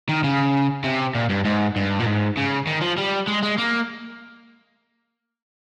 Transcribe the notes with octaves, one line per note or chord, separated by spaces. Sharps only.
D#3
C#3
C3
A#2
G2
G#2
G2
A#2
G#2
C#3
D#3
F3
G3
G#3
G#3
A#3